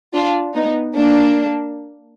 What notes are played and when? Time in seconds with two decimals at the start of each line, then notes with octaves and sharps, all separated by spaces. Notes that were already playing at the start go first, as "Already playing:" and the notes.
0.14 D4 F4
0.55 B3 D#4
0.96 A#3 D4